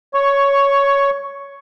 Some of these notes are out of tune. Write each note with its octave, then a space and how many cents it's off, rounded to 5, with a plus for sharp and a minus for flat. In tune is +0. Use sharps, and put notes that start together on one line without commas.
C#5 +10 C#6 +0